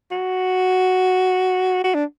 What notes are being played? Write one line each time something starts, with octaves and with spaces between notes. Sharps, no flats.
F#4
F#4
D4